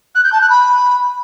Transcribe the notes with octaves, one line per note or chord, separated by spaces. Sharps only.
F#6
G6
A5
F#6
B5